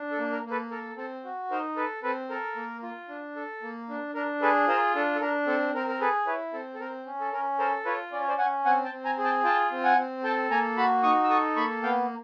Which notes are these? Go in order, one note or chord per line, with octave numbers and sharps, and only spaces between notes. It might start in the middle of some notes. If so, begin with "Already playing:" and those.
Already playing: D4
A4
A#3
A#4
A#3
A4 B4
A4 A#4
C4 A4
F#4
D#4 A#4 C5
A4 B4
C4 A4 B4
A4 A#4
A#3
F4
D4
A4
A#3
D4
D4 A#4
G#4 A4 B4
F4 A#4 C5
D4 A4
A4
D4 A#4
C4 A4
C4 A#4
A#4
G#4 A4 B4
E4 B4 C#5
C4 A4
A4
C4 A#4
C#4
A4
C#4 A#4
A4 A#4 C5
F4 B4 C#5
C#4 D5
C#5
C5 D5
C#4 F#5 G#5
C4 F#5 G#5
G5 A5
C4
G#5 A#5
G#4
G5 A5
F4 G5 A5
C4
F#5 G#5
C4
A4 G5 A5
A#3 G#5 A#5
F#4 A5 B5
D#4 C#6 D#6
E6
A4 C#6 D#6
A#3 B5 C#6
B3 F5 G5